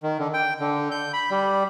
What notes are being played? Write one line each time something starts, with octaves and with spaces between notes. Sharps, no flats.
D#3
D3
G5
D3
G6
B5
G3